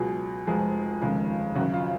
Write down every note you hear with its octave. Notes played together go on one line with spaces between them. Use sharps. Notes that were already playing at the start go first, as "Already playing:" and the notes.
Already playing: C#2 B2 F#3 G#4
F1 F2 F3 G#3 G#4
F1 D#2 C#3 F3 G#3
G#1 F#2 C#3 F#4
F4